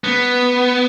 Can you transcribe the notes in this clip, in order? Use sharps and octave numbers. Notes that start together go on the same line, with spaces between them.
B3